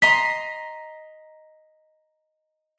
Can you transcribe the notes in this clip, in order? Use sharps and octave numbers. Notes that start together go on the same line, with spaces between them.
D#5 A#5 C6 B6